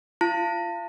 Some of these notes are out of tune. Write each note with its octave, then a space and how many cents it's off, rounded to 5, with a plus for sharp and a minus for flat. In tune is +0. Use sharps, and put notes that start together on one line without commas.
F4 -30 A5 +35